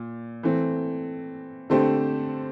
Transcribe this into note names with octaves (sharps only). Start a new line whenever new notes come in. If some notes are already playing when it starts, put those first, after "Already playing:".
Already playing: A#2
E3 A3 C4
D3 A3 C4 G4 C5